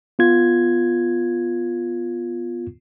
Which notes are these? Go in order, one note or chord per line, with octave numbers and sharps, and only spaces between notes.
B3 F4 G#6